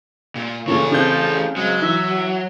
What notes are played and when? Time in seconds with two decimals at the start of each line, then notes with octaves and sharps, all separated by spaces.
0.36 A#2
0.68 A#2 C#3 E3 A4 C#5
0.92 C#3 F3 C4 G6
1.56 F#3 G#3
1.82 E3 E5